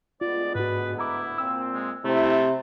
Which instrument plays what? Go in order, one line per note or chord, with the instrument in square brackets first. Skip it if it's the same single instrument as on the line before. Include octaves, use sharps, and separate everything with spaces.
[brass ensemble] D2 G#3 B3 [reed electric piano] F4 [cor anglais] D5
[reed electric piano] G#2 F#4 [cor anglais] B4
[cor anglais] E4 [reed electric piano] A#5 D6
[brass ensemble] A#2 C4 [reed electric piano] E6
[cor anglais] G#3
[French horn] C3 [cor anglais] A3 [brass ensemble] E4